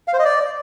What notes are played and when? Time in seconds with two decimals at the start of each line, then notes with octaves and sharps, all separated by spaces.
0.08 F5
0.13 C5
0.19 D#5
0.25 D5